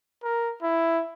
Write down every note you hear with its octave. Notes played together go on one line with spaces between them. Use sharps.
A#4
E4